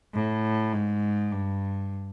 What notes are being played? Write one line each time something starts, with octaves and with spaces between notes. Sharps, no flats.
A2
G#2
G2